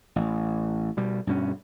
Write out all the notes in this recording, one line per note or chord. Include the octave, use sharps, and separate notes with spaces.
A1
B2 G3
G2 B2 C#4